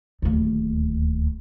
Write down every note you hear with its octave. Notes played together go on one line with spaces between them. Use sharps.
D1 D#2